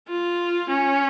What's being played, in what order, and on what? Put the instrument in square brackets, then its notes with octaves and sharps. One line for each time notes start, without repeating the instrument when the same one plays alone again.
[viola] F4
C#4